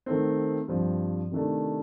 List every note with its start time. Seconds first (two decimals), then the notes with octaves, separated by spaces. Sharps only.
0.06 D#3 A3 C4
0.68 G2 F3 C4
1.31 C3 D#3 A3 D4